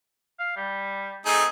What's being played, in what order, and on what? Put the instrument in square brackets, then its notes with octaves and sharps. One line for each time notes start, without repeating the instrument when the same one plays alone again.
[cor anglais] F5
G3
[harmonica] A3 D#4 G#4 [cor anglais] C4